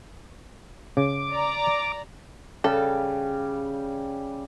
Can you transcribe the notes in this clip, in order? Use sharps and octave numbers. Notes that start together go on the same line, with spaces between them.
C#3 D6
D5 A#5
C#3 G3 G4 A4